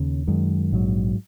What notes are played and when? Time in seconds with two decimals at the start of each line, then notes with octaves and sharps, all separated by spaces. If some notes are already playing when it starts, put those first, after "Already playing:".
Already playing: D#2 C#3
0.27 F#2 D#3 G#3
0.72 A#1 G#2 F#3